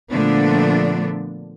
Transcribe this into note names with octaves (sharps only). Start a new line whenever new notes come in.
A#2 D3 F3 A3 B3 D4